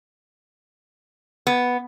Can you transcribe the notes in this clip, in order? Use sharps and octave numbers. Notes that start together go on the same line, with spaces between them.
B3